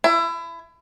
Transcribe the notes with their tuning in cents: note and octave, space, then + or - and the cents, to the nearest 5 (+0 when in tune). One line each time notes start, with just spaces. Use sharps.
E4 +25